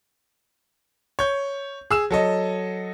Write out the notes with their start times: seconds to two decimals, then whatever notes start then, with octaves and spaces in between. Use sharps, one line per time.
1.19 C#5 G6
1.90 G#4 E6 E7
2.11 F#3 A4 D#5